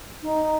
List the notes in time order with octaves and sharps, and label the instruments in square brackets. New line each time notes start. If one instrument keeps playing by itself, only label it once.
[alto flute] D#4